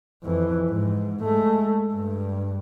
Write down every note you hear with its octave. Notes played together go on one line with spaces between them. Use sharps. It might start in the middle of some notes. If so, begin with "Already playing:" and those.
F2 E3
G#2
G#3 A3
G2